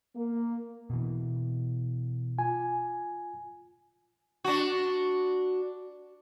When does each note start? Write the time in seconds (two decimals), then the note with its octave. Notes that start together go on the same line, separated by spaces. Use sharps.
0.16 A#3
0.90 B2 E3
2.39 F4 G#5
4.44 D4 F#4